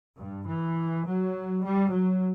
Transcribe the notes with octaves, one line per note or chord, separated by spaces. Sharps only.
G2
E3
F#3
G3
F#3